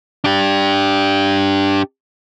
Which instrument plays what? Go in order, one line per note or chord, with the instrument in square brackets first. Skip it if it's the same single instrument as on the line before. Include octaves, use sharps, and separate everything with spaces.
[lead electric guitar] D4 G4